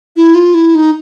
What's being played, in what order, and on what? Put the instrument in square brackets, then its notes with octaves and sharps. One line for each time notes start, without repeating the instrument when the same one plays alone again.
[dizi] E4
F4
E4
D#4